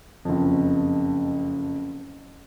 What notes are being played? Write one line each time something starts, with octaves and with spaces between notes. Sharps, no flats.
F#1 F2